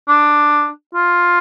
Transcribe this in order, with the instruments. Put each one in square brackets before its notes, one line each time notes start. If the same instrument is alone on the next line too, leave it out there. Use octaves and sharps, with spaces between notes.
[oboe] D4
F4